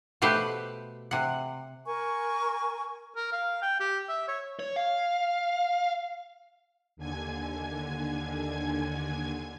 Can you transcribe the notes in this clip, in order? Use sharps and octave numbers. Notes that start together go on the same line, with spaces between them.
B2 A3 G4 B4 C5
C3 F#5
A#4 G#5 C#6
A#4
F5
G5
G4
E5
C#5
C#5
F5
D#2 D3 G#5 G#6